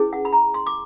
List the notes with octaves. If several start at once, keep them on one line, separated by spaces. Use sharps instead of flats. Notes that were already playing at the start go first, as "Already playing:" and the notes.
Already playing: C#4 E4 G#4 B4
F#5
B5
A#5
C6
D6